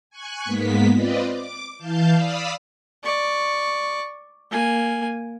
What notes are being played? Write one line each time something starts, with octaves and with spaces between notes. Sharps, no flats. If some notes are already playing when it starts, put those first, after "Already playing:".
G#5 C#6 F#6
G#2 G#3 A#3 B3 B6
C4 F4 B4 D5 D#5
D6
E3 F5 A5 G6
D5 F5 B5 D#6 E6 B6
D5 C#6
A#3 G#5